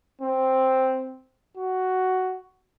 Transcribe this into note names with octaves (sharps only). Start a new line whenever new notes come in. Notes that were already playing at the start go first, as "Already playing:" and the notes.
C4
F#4